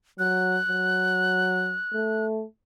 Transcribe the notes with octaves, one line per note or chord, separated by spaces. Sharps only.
F#3 F#6
F#3
A3